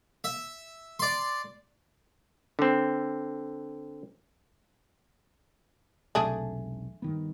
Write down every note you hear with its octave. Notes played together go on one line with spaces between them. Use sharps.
E5
D5 C6
D3 C4
E1 B1 C3 A3 D4 G#4
G2 D#3 B3